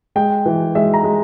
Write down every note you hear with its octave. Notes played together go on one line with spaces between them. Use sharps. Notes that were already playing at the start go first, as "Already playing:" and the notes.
G#3 G5
E3
G#3 E5
A#5
G#3